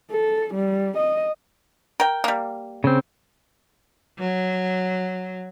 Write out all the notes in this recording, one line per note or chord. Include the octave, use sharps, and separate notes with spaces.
A4
G3
D#5
A#4 G5
G3 A#3
C#3 C4
F#3